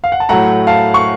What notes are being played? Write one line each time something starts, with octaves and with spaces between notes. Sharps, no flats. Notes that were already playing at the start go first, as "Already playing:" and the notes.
F5
F#5
A5
A2 F#3 A3 F#5 A#5
F5 A5
C#6